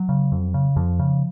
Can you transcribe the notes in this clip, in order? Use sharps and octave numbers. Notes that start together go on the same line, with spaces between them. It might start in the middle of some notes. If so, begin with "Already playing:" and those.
Already playing: F#3
C#3
F2
C#3
F2 F3
C#3